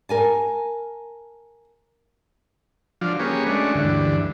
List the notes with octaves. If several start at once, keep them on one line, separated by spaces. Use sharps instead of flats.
A#4 G#5 A5
F3 F#3 D4 F4
A#3 C#4 G4 G#4 B4 C#5
G#3 A3 C#4 D4 F#4
D2 G2 D3 E3